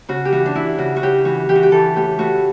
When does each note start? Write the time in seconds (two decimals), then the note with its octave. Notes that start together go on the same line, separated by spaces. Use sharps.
0.09 C#3 F#4
0.25 G4
0.32 E3 F#4
0.46 D4
0.55 E3 E4
0.78 C#3 F#4
0.96 F#4
1.02 C#3 G4
1.25 E3 F#4
1.49 E3 G4
1.56 F#4
1.63 G4
1.71 E3 A4
1.96 A2 G4
2.19 A2 F#4